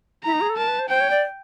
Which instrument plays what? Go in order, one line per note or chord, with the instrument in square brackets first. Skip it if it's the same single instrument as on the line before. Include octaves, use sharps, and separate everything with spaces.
[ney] E4 [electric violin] A#5
[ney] D#4
G#4
A4
[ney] A#4 [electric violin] A5
[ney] B4
C5
[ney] C5 [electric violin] G5
[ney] C#5
D5